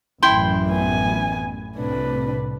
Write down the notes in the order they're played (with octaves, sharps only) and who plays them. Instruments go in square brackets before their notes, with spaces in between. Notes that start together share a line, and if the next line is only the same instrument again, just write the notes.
[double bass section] A1 F#2 E3 [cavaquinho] E4 G5 C6
[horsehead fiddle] B3 G#5
[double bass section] C2 A2 C3 [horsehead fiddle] D4 B4